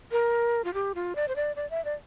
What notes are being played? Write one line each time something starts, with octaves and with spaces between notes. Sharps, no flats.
A#4
F4
G4
F4
D5
C5
D5
D5
E5
D5